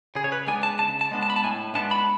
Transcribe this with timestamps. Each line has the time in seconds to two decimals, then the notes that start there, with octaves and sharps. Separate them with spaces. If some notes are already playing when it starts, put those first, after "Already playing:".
0.15 C#3 G#4
0.24 C#5
0.32 B4
0.47 G#3 B3 D4 G#5
0.63 A5
0.79 C#3 A5
1.01 A5
1.11 G#3 B3 D4
1.23 A5
1.30 B5
1.36 A5
1.44 A2 G#5
1.75 G#3 B3 D4 A5
1.91 B5